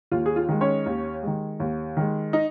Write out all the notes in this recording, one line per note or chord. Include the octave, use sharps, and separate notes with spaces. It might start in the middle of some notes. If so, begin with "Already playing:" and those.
D#2 F4
G#4
F4
D#3 G#3
C#4 C#5
D#2
D#3 G#3
D#2
D#3 G#3
D#4